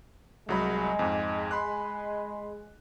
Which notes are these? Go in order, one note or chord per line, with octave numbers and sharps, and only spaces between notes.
C2 F#3 G#3 B5
F2 G#2
B5 C6 F#6